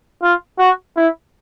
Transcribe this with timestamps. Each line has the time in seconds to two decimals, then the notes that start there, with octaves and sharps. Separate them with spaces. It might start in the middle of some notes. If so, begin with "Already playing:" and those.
0.22 F4
0.59 F#4
0.96 E4